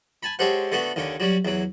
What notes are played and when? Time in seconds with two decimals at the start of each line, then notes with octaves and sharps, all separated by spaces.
0.23 G#5 A5 B5
0.39 G#3 C#4 G4 A4 C5 F#5
0.72 D3 A3 B3 F#4
0.96 D#2 D3 C#4
1.20 F#3 G3 C#4
1.45 E2 F#3